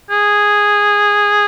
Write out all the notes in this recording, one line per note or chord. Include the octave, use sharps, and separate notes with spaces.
G#4